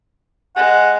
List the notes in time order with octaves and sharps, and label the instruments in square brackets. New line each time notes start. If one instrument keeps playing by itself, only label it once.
[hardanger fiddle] G#3 [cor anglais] F#5